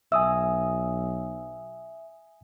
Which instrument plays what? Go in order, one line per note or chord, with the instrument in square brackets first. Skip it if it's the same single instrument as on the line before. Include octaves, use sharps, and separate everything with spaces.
[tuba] B1 [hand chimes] E5 [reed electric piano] G#5 D#6 E6